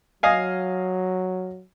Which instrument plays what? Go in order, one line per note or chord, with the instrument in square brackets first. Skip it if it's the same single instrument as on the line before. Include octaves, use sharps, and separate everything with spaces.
[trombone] F#3 [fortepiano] D#5 F5 G#5